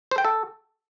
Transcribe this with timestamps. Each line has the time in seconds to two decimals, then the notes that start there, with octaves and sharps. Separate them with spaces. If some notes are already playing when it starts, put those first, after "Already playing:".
0.11 C5
0.18 G5
0.25 A4